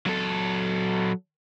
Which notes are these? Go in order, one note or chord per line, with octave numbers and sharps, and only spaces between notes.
F#3 A4